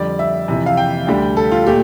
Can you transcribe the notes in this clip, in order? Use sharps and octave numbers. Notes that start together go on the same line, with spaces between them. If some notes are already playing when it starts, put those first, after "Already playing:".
Already playing: F2 D3 G3 D5
E5
F2 C3 E3
F5
G5
D2 D3 G3
A4
F4
A#2 A3 G4